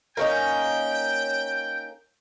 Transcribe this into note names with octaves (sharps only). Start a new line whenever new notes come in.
A#3 C#4 D#4 G5